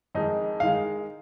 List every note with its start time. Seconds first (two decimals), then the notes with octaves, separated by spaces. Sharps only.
0.15 F2 D#3 G#3 D#4
0.60 D#3 G#3 F5